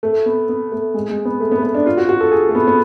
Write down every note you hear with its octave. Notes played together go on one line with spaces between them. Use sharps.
A3
B3
B3
A3
G#3
G#3
B3
A3
B3
A3
B3
D4
F4
F#4
F#4
A4
G#4
A3
B3
B3